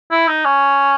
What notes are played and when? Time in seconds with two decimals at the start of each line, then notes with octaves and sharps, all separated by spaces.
0.11 E4
0.27 D#4
0.45 C#4